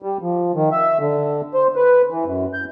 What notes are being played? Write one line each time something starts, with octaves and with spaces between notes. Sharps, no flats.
G3
F3
D#3
E5
D3
C5
B4
E3
F#2
G6